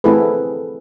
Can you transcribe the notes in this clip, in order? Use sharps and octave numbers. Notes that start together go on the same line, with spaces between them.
A3 C4 E4 G#4 A4 B4